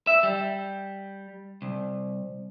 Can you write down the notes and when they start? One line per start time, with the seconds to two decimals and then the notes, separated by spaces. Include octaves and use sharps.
0.07 E5
0.23 G3
1.62 C2